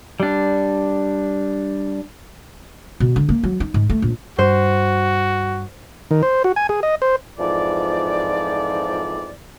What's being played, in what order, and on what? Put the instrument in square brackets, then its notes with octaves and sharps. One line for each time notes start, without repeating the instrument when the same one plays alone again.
[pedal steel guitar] G3 D4
[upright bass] B2
D3
A#3
F#3
D#4
G#2
A3
A#1
[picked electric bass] G2 [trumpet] F#4 [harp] C5
[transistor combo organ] D#3
C5
F#4
G#5
G#4
D#5
C5
[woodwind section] F2 G#2 E3 F3 D5